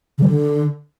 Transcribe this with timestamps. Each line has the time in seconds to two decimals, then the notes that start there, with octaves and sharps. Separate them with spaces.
0.18 C#3
0.23 G3
0.28 D3